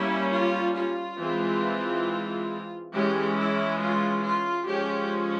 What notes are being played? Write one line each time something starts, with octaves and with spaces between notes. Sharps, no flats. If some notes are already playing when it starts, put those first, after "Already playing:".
Already playing: G3 A#3 C#4 E4
F4
F4
E3 G#3 C4
E3 G#3 C#4 G4
E4
F4
F4
F3 G#3 C#4 G4